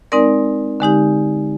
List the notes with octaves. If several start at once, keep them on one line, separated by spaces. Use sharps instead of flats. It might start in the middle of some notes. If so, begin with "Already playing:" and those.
G#3 C4 D#4 A#4 D5
D3 G#3 D#4 G4